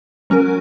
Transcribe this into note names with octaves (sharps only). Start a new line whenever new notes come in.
F#3 C#4 F#4 A#4